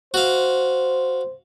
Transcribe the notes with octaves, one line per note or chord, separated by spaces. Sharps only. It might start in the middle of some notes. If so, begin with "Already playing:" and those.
F#4 C5 F5